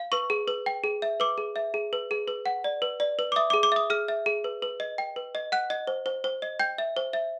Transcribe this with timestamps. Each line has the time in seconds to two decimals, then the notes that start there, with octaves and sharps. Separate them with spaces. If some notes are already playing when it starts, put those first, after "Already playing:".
Already playing: F5
0.12 B4 C#6
0.30 G#4
0.48 B4
0.66 G5
0.84 G#4
1.02 E5
1.20 B4 D6
1.38 G#4
1.56 E5
1.74 G#4
1.93 B4
2.11 G#4
2.28 B4
2.46 F#5
2.64 D5
2.82 B4
3.00 D5
3.19 B4
3.32 D6
3.36 E5 D#6
3.50 G#4 D6
3.63 D6
3.72 E5 D#6
3.90 G#4 F6
4.08 E5
4.26 G#4
4.44 B4
4.62 B4
4.80 D#5
4.98 G5
5.16 B4
5.35 D#5
5.52 F#5 F#6
5.70 D#5
5.87 C5
6.06 C5
6.24 C5
6.42 D#5
6.59 G5 G6
6.78 E5
6.97 C5
7.13 E5